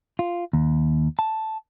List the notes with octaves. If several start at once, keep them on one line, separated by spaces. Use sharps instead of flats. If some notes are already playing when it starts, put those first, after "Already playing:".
F4
D#2
A5